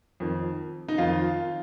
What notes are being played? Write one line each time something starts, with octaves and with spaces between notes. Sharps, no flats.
F2 D#3
D#4
F2 D#3 F4